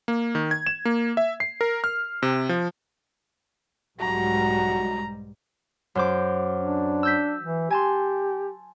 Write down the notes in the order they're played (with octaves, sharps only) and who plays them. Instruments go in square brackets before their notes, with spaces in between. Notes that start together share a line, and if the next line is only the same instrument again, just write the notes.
[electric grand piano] A#3
D#3
G#6
E7
A#3
E5
C7
A#4
F6
C3
F3
[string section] B1 G#2 G3 [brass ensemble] F#3 F#4 [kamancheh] A#5
[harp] F#2 C5 D6
[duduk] D4
[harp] E6 G6 B6
[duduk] E3
[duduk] G4 [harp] G#5 A5 C6